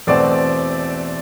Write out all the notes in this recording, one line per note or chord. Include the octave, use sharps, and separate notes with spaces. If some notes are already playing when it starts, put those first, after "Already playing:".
E2 B2 A3 C4 D5